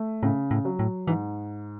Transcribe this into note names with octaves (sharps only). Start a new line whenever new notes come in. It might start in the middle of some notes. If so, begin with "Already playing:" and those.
Already playing: A3
A2 C#3
A2
F#3
A2
G#2 E3